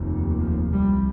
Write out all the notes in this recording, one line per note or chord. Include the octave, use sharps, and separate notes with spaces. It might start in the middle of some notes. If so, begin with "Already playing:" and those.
Already playing: F1 D#2
F3
C2 C3 G3